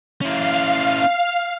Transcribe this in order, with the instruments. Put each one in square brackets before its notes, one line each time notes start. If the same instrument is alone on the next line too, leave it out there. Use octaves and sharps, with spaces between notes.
[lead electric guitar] C#4 E4 [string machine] F5